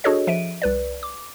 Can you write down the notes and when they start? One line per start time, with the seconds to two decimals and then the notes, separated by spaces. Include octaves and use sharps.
0.04 D4 F#4 G#4 A4 C#5 D#5
0.27 F3 E5 D7 D#7
0.62 C2 B4 D5
1.03 D6